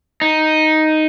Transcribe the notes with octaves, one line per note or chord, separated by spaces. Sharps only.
D#4